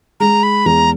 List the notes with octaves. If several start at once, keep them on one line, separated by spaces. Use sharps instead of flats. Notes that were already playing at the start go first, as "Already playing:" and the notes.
G#3 A#5
B5
E2 A#5